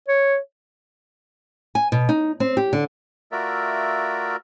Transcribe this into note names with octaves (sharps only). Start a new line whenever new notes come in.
C#5
G#5
B2
D#4
C4
G4
D3
A3 F4 F#4 A#4 D5 E5